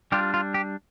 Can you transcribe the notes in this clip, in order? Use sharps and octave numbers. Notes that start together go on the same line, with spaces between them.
G3 D4 F4 G4
F4
G4